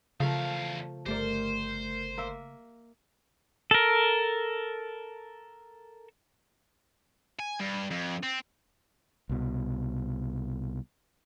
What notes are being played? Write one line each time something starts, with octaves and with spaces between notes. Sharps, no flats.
E2 C#3 F3 A3 A#4 F5
G1 A3 G4 A#4 C5 D5
A#3 E5
A4 A#4
G#5
G2
F2
C4
C2 B2